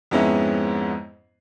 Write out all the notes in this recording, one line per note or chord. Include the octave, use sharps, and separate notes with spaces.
F2 G#2 G#3 B3 C#4 E4